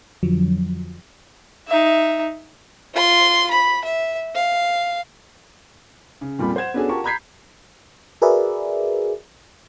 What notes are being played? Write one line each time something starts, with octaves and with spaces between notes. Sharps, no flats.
F2 D3 F3 F#3
D#4 E5
F4 C6
B5
E5
F5
C#3
F2 A#2 G3 F4 G4 B5
C5 F#5 G#6 E7
B3 C#4 D4 F#4 G#4 A4
F4 G4 A#4 F#5 A5 C#6
A#5 B5 G6 G#6 B6 C7
F#4 G#4 A#4 B4 D5 E5